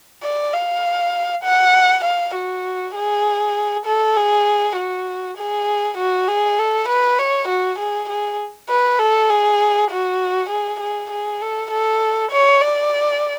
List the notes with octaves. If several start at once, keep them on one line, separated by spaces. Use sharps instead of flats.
D5
F5
F#5
F5
F#4
G#4
A4
G#4
F#4
G#4
F#4
G#4
A4
B4
C#5
F#4
G#4
G#4
B4
A4
G#4
F#4
G#4
G#4
G#4
A4
A4
C#5
D5